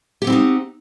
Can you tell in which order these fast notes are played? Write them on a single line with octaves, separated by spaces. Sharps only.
G4 F#5 C4 E4 D#4